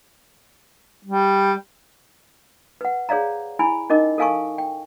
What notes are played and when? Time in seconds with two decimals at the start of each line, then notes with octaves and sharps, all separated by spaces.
1.05 G3
2.81 B4 F#5
3.09 G#4 C#5 D5 F5 A#5
3.59 E4 G#5 B5
3.90 C#4 D#4 A#4 D#5 D6
4.18 A4 A#4 F5 G#5 A5 C#6
4.58 G5